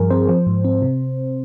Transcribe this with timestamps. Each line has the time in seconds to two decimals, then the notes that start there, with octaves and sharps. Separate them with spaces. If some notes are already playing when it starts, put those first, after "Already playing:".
Already playing: G2 F3 G#4 A#4
0.10 C4 C5
0.28 F3 C5
0.47 G#2
0.65 C4
0.82 C3